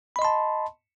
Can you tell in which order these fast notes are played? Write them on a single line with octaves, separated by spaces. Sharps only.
B5 D#5 C6 A5